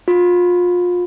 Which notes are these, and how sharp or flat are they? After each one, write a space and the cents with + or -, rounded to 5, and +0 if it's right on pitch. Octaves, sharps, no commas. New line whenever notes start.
F4 +30